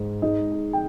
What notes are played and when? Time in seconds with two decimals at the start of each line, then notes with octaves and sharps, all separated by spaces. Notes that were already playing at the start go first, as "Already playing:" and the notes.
Already playing: G#2
0.22 G#3 D#4 D#5
0.52 G#4
0.73 G5